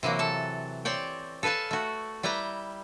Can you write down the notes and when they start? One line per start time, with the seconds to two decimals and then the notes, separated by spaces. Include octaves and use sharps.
0.03 C3 E3 F#3 A#3
0.19 A4 A5
0.85 C4 C#5 D5 G5
1.43 A4 B4 F5 G#5 A5
1.71 A3 F#4
2.23 G3 E4 B4 G5 A#5